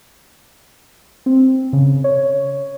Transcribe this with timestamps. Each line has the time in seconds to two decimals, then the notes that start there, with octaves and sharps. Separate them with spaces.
1.26 C4
1.73 C#3
2.04 C#5